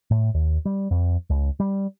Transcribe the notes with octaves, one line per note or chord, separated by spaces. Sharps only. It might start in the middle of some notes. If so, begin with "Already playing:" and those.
A2
D#2
G3
F2
C#2
G3